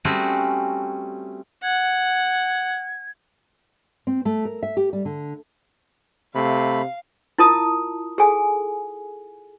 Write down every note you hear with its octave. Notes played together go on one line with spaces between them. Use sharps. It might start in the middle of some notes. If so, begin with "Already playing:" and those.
G3 A3 C4 C#4 F#4 G#4
F#5 G#6
C4
A3
A#4
E5
G4
G3
D3
C3 A3 F5 B5
E4 F4 A#4 A5 D#6
G#4 A4 G#5